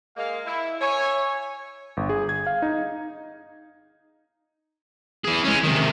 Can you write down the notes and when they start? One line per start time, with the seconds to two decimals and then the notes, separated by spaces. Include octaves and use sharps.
0.17 G#3 A#3 F5
0.46 E4
0.81 C#5 E5 G#5
1.97 G1
2.09 G#4
2.29 G#6
2.47 F5
2.62 D#4
5.24 E3 G#4
5.44 G#3 C#4
5.63 C3 D#3